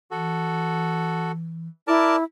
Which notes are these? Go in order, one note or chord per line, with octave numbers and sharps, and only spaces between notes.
E3 F#4 A4
E4 A#4 D5 A5